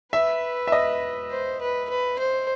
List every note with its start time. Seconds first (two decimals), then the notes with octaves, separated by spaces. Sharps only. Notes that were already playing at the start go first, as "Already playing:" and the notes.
0.13 B4 E5
0.67 E5
0.72 D#5
1.31 C5
1.61 B4
1.89 B4
2.19 C5